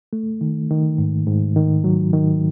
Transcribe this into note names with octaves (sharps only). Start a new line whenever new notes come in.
A3
D#3
D#3
G#2
G#2
D#3
F#3
D#3